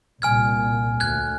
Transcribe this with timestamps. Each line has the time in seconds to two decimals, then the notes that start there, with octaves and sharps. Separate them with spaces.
0.22 C2 A#2 G#5 F6 G#6
1.00 D2 F#6 G#6